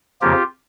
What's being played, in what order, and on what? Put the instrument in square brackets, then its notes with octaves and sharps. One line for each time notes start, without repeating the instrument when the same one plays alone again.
[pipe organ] F2 C#3 F3 A#3 F4 G4